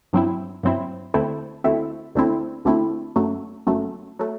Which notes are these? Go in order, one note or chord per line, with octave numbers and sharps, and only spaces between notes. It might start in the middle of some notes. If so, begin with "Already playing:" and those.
G2 F#3 C4 E4
G2 F#3 C4 E4
D2 D3 A3 C4 E4
D2 D3 A3 C4 E4
D2 D3 A3 C4 E4
D2 D3 A3 C4 E4
G1 F#2 F#3 A3
G1 F#2 F#3 A3
F#3 A3